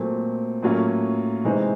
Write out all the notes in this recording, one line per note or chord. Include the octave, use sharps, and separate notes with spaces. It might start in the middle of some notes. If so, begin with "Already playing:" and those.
Already playing: A#2 F#3 A3 C4
A2 F#3 A#3 C#4 F4
C3 E3 G#3 C4 D#4